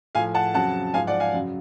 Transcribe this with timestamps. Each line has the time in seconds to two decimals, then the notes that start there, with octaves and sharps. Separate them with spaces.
0.15 A2 F3 F5 G#5
0.34 F#5 A5
0.54 F2 C#3 F#3 F#5 A5
0.94 G#2 F3 F5 G#5
1.07 D5 F#5
1.20 F5 G#5
1.33 F#2 C#3 F#3